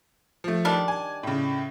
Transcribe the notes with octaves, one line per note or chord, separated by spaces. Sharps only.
F3 A3
D#3 G3 D4
G#5
A2 C#3